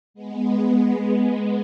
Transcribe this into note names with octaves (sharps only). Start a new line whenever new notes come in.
G#3 B3